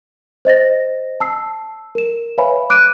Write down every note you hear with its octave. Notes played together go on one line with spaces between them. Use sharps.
C5 D#5 A6 A#6
A5 E6 C7
A#4 E7
B4 C#5 E5 F5 G#5 B5
D6 F#6 D7 D#7